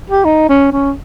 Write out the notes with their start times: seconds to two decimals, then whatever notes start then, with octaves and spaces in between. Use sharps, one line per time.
0.10 G4
0.25 D#4
0.49 C#4
0.72 C#4